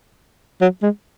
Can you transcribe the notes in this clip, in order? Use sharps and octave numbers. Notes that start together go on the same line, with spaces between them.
F#3
G#3